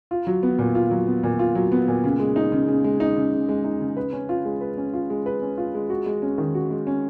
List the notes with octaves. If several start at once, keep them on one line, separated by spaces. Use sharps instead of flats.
F4
F#3
B3
A#2
F4
F#3
B3
A#2
F4
F#3
B3
A#2
C#3
G#3
D#4
C#3
C#3
G#3
D#4
C#3
C#3
G#3
D#4
C#3
B4
C#4
F4
G#3
B4
C#4
F4
G#3
B4
C#4
F4
G#3
F#4
G#3
C#4
D#3
F#4
G#3
C#4